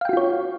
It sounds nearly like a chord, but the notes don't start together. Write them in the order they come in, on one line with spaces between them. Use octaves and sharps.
F5 G5 F#4 F4 C#5